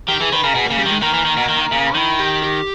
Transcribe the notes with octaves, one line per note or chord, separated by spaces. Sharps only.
D#3 G4
E3 G#4
D#3 B4
C#3 A#4
B2 G#4
C#3 A#3
G3
D#3 G#3
D#3 A#3
E3
D#3
B2
D#3
C#3
D#3 E4
G4
G4